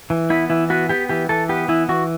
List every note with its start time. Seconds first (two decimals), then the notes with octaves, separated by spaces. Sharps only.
0.10 E3
0.30 B3 E4
0.50 E3 E4
0.70 B3 F#4
0.89 B3 G4
1.09 E3 G4
1.29 E3 A4
1.49 B3 G4
1.68 E3 E4
1.89 E3 F#4